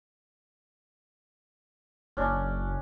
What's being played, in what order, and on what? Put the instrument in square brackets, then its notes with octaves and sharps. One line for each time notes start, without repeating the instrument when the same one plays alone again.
[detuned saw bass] F#1 [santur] C#4 D4